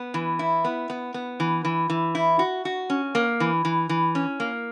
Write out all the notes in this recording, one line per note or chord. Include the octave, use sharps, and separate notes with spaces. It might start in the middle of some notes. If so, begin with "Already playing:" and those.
Already playing: B3
E3
E4
B3
B3
B3
E3
E3
E3
E4
F#4
F#4
C#4
A#3
E3
E3
E3
C#4
A#3